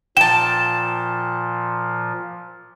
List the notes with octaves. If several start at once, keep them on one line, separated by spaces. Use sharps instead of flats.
A#2 F3 G5 A5 E7